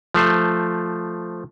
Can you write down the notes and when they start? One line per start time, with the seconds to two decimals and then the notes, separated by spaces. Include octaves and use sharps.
0.14 F3 A3 C5